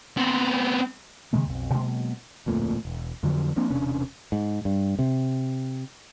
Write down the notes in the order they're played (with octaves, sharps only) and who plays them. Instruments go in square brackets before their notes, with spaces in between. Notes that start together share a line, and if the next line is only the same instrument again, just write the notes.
[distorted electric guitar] B3 C4
[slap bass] C3 D#3 G#3 A#3
B1 F2
B2 F#3 G#3 A#3
[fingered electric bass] D1 F2 A#2 A3
E1
F2 D3 F3 F#3
F3 A#3 C4 D4
E1 C3 C#4 D4
G#2
G2
C3